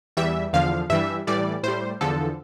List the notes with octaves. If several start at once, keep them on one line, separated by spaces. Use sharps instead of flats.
E2 E3 G3 E5
E2 D3 F3 F5
G2 E3 G3 E5
A2 E3 G3 D5
A2 G3 C5
E2 D3 F3 A4